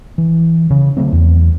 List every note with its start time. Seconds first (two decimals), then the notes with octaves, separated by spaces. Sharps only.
0.18 E3
0.70 C#3
0.97 C#3 F#3 A3 C4
1.12 E2